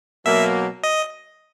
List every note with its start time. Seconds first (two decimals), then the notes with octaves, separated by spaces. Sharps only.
0.25 B2 F#3 A#3 E5
0.83 D#5